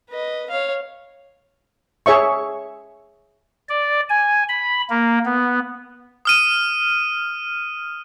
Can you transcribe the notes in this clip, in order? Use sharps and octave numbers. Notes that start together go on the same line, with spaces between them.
B4 D#5
C#5 F5
G#4 C#5 E5 C#6
D5
G#5
B5
A#3
B3
D#6 F6 D#7